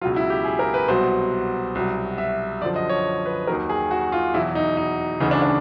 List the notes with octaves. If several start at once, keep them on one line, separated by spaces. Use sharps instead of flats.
C#2 B2 F#3 F4
E4
G4
G#4
A#4
B4
C2 B2 F#3 C5
C2 B2 F#3
E5
F#2 D3 F3 D5
D#5
C#5
B4
D#2 D#3 F#3 A#4
G#4
F#4
F4
E2 B2 F#3 E4
D#4
D#4
D2 C#3 E3 D#4
D4
D4